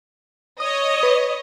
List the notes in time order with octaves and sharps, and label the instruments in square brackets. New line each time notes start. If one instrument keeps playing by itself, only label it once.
[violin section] C#5 D#5 [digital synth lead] D#6
[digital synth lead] B4